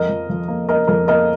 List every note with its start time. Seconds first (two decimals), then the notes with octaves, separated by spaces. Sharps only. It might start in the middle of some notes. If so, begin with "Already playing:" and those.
Already playing: F2 A#4 D#5
0.09 F3
0.29 F3
0.48 A#3
0.68 A#3 A#4 D#5
0.88 F2 A#4
1.07 A#3 A#4 D#5